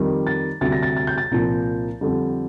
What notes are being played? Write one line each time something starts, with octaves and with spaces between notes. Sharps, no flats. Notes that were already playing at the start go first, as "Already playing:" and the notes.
Already playing: F2 D#3 G3
A6
D2 C3 G3 A6
A#6
A6
A6
G6
A6
C2 A#2 F3
F2 D3 G3